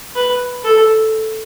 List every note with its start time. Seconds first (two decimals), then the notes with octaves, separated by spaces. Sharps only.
0.16 B4
0.64 A4